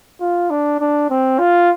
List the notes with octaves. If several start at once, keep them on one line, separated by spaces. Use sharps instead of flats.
F4
D4
D4
C4
F4